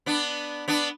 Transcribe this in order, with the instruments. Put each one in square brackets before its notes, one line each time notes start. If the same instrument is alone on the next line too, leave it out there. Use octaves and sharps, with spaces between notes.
[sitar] B3 D4
B3 D4